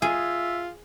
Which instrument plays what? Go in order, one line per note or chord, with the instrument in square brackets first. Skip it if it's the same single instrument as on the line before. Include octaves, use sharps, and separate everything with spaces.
[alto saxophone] F4 [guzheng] G#4 [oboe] E5